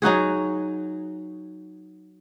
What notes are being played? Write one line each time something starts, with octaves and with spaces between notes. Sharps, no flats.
F#3 D#4 F#4 G#4